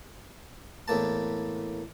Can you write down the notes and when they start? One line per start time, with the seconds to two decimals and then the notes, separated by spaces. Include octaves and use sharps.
0.88 E2 A2 A#3 A5